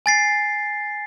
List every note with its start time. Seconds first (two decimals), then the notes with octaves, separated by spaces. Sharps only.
0.06 G#5 A6 C7